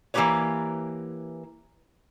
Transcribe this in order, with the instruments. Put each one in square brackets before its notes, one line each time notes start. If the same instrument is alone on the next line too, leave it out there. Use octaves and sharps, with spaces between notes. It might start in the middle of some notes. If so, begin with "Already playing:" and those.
[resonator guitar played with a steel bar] E3 A#3 E4 G4 B4 C#5